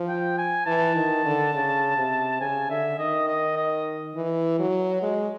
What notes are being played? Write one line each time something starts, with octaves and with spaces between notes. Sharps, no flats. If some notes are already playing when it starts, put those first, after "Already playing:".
Already playing: F3
G5
G#5
E3 A5
D#3
D3
C#3
C3
C#3 G#5
D3 E5
D#3 D#5
D#5
D#5
E3
F#3
G#3